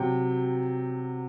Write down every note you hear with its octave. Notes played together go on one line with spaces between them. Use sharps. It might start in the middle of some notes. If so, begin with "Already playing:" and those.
Already playing: C3 F#3 G5